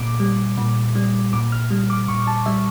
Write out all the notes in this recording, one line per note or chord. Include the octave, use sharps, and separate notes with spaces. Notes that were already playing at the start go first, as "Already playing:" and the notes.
Already playing: A#2 D6
G3
A#2
G3
A#2 D6
F6
G3
D6
A#2 C#6
A5
G3 E5